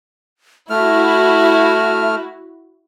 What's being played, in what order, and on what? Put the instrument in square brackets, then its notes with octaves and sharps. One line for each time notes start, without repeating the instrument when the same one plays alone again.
[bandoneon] A3 F6 [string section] E4 F#4 [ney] E5